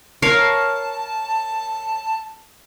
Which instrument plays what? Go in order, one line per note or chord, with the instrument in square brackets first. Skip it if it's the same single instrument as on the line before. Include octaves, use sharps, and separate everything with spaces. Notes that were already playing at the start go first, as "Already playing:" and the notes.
[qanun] A#4 C#5 F5 [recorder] A5